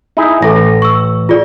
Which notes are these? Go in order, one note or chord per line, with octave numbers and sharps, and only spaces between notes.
D#4 E4 G#4
A1 A4 A#6
C#6 E6
F4 G#4 D5